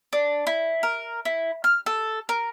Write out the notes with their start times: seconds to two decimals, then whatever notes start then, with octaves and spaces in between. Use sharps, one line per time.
0.13 D4
0.47 E4
0.83 A#4
1.25 E4
1.64 F6
1.86 A4
2.29 A#4